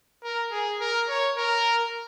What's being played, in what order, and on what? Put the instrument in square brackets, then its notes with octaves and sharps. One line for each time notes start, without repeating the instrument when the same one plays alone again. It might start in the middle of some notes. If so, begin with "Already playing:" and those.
[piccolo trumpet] A#4
G#4
A#4
C#5
A#4